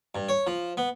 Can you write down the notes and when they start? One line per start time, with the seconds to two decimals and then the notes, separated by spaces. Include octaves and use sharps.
0.15 G2
0.29 C#5
0.47 F3
0.77 B3